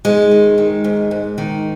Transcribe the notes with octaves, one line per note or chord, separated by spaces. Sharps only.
G#2 G#3
D#3
D#3
G#2
G#2
D#3